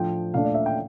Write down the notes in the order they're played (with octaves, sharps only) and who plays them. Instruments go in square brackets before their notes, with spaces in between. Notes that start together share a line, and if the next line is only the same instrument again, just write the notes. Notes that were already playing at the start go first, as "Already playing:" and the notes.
Already playing: [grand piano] A2 F3 A3 D4 G5
A#2 A3 D4 F5
D5
E5
G5